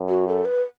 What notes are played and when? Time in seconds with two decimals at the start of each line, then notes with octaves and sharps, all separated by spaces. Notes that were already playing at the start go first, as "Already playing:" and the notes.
Already playing: F#2
0.09 F#4
0.28 A4
0.45 B4